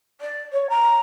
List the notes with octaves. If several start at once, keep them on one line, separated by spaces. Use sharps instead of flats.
D5
C#5
A#5